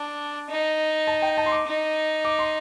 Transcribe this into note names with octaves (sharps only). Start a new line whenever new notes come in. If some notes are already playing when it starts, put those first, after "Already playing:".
Already playing: D4
D#4
A5
G5
A5
C6
D6
D#4
D6
C6